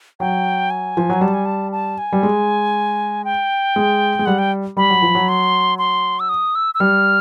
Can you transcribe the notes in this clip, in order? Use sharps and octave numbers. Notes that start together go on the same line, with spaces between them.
F#3 G5
G#5
F3
F#3
G3 A5
G#5
A5
A5
G#5
G3
G#3
G5
G#3
G#3
G3 F#5
G5
G3 B5
F#3
F3
F#3
C6
C6
E6
D#6
E6
E6
G3 F6